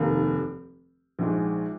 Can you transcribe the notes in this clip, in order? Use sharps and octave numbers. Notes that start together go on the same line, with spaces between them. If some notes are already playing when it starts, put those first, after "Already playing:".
Already playing: F1 D#2 D#3 A#3
A#1 G#2 F3 G#3